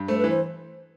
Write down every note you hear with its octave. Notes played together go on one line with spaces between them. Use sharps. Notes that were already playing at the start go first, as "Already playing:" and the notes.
Already playing: G2
A3 C5
B4
E3
C5